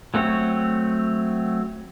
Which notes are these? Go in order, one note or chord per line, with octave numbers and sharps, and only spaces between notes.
F#3 A3 C4 C#5